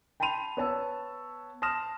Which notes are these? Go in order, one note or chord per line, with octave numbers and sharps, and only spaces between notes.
G5 A5 B5 C6 D#7 F7
B3 C#5 A5 E6
A5 C6 D#6 F6 A#6 E7